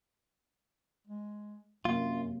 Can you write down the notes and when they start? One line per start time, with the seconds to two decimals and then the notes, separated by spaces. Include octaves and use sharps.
1.07 G#3
1.85 F#2 C3 F#3 A#3 F4